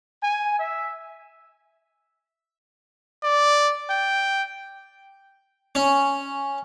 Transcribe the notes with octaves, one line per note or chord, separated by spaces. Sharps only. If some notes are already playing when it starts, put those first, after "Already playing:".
G#5
E5
D5
G5
C#4